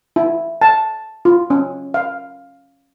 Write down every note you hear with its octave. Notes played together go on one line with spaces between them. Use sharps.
E4
A5
F4
C#4
F5